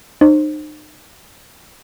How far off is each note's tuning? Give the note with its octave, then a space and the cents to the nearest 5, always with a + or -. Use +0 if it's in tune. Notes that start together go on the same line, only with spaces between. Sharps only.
D#4 -40 C5 +25